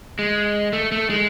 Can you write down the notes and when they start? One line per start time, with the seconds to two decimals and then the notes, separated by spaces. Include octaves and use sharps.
0.19 G#3
0.73 A3
0.92 A3
1.10 G#3